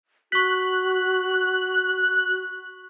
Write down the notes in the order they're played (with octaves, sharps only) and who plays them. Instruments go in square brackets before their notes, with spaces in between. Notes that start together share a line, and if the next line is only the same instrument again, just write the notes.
[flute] F#4 [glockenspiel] C#6 B6 [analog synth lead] F#6